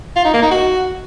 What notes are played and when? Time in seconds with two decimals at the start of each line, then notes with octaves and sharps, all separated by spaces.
0.16 F4
0.25 D#4
0.34 A#3
0.42 D#4
0.51 F#4